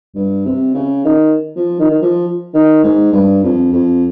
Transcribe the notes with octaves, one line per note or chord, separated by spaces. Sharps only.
G2
C3
C#3
D#3
F3
D#3
D#3
F3
D#3
G#2
G2
F2
F2